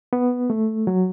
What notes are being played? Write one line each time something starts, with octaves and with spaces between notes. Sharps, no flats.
B3
A3
F#3